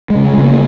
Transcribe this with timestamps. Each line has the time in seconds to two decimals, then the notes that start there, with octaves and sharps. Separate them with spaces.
0.10 G#3
0.15 C#3
0.34 C#3 G#3
0.44 A#3